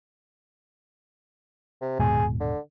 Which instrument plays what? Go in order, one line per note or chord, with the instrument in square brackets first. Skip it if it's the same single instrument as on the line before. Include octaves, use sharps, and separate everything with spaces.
[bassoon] C3
[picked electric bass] D#1 G#2 B2 [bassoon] G#4
[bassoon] D3